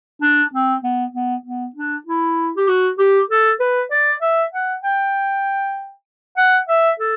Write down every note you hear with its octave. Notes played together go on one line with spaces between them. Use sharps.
D4
C4
B3
B3
B3
D4
E4
G4
F#4
G4
A4
B4
D5
E5
F#5
G5
F#5
E5
A4